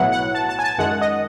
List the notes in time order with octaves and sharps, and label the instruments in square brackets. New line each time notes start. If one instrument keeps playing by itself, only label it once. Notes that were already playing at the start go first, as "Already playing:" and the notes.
Already playing: [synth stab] B1 A2 F#3 B3 E4 F#5
F#5
A5
A5
G#5
A5
F#2 D#3 G#3 F#5
D#5